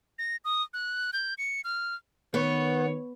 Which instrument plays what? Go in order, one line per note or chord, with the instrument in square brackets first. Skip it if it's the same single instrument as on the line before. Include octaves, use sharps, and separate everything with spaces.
[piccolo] A#6
D#6
F#6
G6
C#7
F6
[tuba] D#3 [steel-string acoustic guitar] B3 [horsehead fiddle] C#5